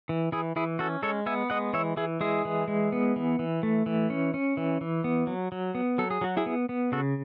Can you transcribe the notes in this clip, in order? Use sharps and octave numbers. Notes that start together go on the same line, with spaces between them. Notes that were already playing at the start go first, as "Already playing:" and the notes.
E3
E3 E4 G#4
E3 E4 G#4
C#4 F#4 A4
G#3 A4 C#5
B3 E5 G#5
G#3 D#5 F#5
E3 C#5 E5
E3 E4 G#4
G#3 E4 G#4
E3
G#3
B3
E3
E3
A3
E3
C#4
C#4
E3
E3
B3
F#3
F#3
B3
F#3 A4
G#4
F#3 F#4
E4 G#4
B3
B3
C#3 F#4 A4